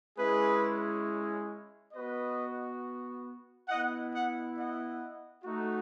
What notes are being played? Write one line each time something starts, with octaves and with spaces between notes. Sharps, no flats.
G#3 C#4 E4 G#4 B4
B3 F#4 B4 D#5
B3 E4 D#5 F#5
D#5 F#5
D#5 F#5
A3 D#4 F#4